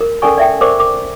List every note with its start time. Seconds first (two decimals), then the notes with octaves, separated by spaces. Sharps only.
0.01 A#4
0.22 C#4 A4 A#4 D5 G#5 C#6
0.38 D5 E5 G5
0.61 A#4 C5 D5 C#6 D6
0.79 A#4 D6